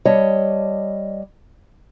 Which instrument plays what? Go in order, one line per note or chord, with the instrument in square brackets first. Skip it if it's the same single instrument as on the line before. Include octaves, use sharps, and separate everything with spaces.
[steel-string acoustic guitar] G3 C#5 D#5 A5